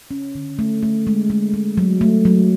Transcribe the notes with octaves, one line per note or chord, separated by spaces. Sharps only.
C#4
D3
A3
A3
G#3
G#3
G#3
F#3
A3
F#3